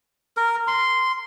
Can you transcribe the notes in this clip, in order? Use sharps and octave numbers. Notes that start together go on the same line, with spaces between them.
A#4
C6